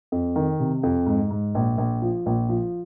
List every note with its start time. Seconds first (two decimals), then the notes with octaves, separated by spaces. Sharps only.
0.12 F2
0.36 D#3
0.60 C3
0.83 F2
1.06 G#2
1.31 G#2
1.55 A#1
1.78 A#1
2.02 F3
2.26 A#1
2.49 F3